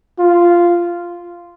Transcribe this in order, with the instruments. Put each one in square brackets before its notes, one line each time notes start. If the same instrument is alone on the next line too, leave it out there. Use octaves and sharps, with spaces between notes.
[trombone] F4